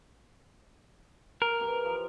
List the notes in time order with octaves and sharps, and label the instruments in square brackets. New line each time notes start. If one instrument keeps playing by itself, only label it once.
[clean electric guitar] A#4
[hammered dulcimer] E3 C4 G4
F3